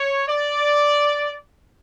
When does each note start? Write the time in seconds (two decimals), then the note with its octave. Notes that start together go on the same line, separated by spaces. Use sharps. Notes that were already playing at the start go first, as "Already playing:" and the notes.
Already playing: C#5
0.28 D5